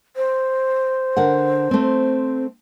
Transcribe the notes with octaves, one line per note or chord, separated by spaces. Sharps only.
C5
D3 A#4 F#5
A3 C4